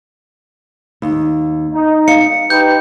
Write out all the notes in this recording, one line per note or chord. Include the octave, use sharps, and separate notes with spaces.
D#2
D#4
F5 C#7
D#4 G4 B4 G6